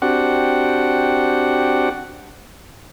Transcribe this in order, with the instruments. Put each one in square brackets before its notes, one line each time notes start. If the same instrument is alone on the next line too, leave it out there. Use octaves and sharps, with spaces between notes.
[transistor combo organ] C4 D4 F#4 G4 F#5